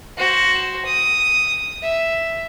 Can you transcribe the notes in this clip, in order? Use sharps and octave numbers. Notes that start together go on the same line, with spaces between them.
F#4 C5
D#6
E5